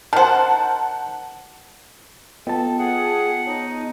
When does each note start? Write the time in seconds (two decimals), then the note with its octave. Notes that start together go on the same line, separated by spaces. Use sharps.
0.13 D#3 C5 F#5 A5
2.47 B3 F4 A4 D#5 G5 A5
2.79 G#4 F#5
3.47 D#4 C#5 C#7